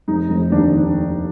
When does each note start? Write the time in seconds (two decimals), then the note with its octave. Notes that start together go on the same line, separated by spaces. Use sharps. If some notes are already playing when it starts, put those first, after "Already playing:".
0.08 F1 D#4
0.30 F1
0.52 D#2 D4
0.74 D#3